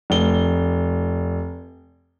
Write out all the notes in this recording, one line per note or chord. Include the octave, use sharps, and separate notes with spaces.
F1 G7